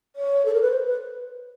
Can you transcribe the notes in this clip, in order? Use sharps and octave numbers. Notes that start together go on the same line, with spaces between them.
C#5
A4
A#4
B4
C5
B4